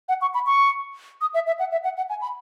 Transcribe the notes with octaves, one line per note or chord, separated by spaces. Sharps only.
F#5
C#6
B5
C#6
D#6
E5
E5
F#5
E5
F#5
F#5
G#5
B5